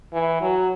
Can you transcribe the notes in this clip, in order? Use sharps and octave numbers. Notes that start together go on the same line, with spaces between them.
E3
F#3